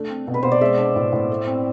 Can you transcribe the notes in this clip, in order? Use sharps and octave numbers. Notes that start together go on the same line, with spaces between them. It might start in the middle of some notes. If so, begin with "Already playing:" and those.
Already playing: A3 D4
C4
B2
B4
B2 C5
D5
G#3 E5
D4
A2
A2
A3
C4